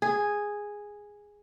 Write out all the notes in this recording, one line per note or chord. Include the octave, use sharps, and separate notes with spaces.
G#4